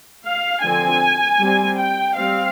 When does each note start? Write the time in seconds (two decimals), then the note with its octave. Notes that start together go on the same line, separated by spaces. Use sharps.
0.25 F5
0.63 D3 F3 C4 G#5
1.40 G3 C4
1.79 G5
2.18 G3 C4 F5